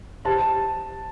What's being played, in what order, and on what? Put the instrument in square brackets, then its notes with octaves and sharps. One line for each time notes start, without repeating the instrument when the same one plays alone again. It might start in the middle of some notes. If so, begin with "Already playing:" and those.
[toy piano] G4 C5 E5 C6 [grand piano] A5